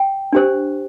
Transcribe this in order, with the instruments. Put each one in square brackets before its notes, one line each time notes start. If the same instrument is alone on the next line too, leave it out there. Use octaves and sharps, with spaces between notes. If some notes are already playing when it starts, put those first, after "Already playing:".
Already playing: [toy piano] G5
D4 G4 C5